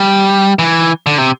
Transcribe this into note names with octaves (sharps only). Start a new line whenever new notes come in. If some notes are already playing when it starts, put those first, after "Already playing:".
Already playing: G3
E3
D3
C3